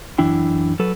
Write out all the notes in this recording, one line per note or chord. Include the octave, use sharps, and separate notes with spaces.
F#2 E3 D4 E4 G5
F#3 A4 B4